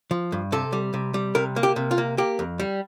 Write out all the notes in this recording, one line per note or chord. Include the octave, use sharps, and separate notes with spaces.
F3
G2
C3 A4
G3
C3
G3
C3 A#4
A#3
G4
C3
F4
A#3
A#3 G4
F2
G3